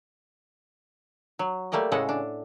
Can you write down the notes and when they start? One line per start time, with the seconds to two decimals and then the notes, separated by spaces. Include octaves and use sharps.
1.39 F#3
1.72 G3 A3 A#3 D5 D#5
1.92 A2 C#3 G#3 A4 D#5 F#5
2.09 D4